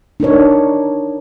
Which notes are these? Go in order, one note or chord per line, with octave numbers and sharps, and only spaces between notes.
D4 D#4 A#4 C#5